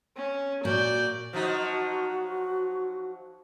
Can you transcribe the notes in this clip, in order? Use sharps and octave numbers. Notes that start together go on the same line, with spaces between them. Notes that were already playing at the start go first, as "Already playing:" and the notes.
C#4
A#2 F#4 D5 G6
F3 F#3 D#4 F#4